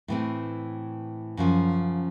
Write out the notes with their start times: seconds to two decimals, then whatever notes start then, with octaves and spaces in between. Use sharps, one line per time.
0.08 A2 E3 A3 C4
1.37 F#2 C#3 F3